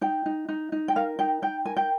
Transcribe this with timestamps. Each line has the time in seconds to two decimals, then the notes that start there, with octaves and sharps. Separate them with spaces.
0.01 D#4 G5
0.26 D#4
0.49 D#4
0.72 D#4
0.88 G5
0.96 A#4 F5
1.19 D#4 G5
1.42 D#4 G5
1.65 A#4 G#5
1.77 G5